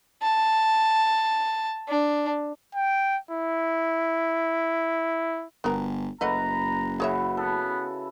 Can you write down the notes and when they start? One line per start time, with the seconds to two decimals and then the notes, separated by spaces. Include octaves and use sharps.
0.23 A5
1.88 D4
2.75 G5
3.31 E4
5.64 G1 B3 F#4 A#4
6.21 F#1 A3 B4 D#5 F#5 A#5
7.00 C#3 E4 F#4 G#4 C#5 E5
7.37 B3 A4